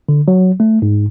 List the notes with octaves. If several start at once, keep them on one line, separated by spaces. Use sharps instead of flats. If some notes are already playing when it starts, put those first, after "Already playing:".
D3
F#3
A3
G#2